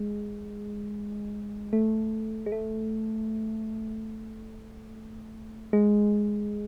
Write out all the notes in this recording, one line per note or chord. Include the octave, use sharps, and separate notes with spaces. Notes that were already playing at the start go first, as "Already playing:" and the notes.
Already playing: G#3
A3
G#3
A3
G#3